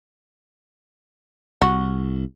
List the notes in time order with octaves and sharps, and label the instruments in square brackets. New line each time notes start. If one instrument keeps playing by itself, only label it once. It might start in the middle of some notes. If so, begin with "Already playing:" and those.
[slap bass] C2 [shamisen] F#4